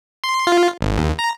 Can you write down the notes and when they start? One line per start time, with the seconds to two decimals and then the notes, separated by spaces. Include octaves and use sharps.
0.24 C6
0.47 F4
0.81 G#1
0.98 D#2
1.19 A#5